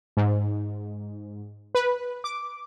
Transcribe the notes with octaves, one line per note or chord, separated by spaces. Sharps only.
G#2
B4
D6